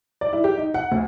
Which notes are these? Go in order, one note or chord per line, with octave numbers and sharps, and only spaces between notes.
D5
E4
G4
D#4
F#5
D2